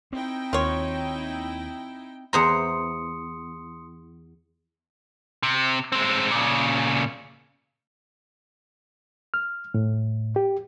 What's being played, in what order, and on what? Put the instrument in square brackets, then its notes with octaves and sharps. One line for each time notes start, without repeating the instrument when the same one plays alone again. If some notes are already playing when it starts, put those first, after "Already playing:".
[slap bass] C4 [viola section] D#4 E4 G5
[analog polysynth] D#2 [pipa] F4 C#5
[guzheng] E2 C5 A#5 [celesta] C6 D#6 C#7
[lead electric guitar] C3
G#3 C4
A#2 C#3
[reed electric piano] F6
A2
G4